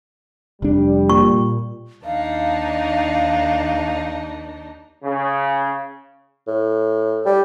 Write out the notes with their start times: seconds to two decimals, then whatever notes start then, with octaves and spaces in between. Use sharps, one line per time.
0.62 F1 G3 D4
1.10 A#2 C#6
2.05 D#2 D4 D#4 F5
5.03 C#3
6.48 A2
7.26 G3